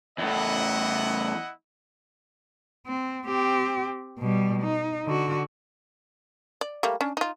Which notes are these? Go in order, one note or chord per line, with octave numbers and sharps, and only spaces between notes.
E2 A2 E4 D#5 F#5
C4
C4 G4
B2 G3
D#4
D3 F#4
D5
G3 A3 A#3
C#4 D4
D#4 F4